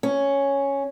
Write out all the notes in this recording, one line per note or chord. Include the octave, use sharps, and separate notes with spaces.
C#4